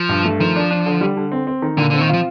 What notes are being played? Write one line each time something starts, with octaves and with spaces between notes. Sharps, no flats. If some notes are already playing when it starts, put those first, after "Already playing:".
Already playing: F3
G2
A3
D#3 F3
D4
D4
D3
G3
D3
C4
C4
D#3
A#2 D3
D3 C4
D#3
F3 F4